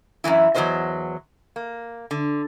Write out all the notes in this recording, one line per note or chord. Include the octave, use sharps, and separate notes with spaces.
F#2 C#3 E3 E4
E2 F#3 G3 B4 C5 D#5
A#3
D3